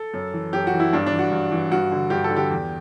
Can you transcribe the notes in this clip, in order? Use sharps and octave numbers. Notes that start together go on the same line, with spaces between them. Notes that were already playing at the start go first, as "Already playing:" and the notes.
Already playing: A4
F#2
E3
F#2 G4
F#4
E3
E4
G2 D4
D4
E3
F#4
G2
E3
G2 F#4
D3
G2 G4
A4
D3
G4
E2